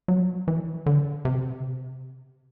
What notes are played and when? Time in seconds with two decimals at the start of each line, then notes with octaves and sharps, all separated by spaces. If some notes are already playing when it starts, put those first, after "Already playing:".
0.08 F#3
0.48 E3
0.86 D3
1.25 C3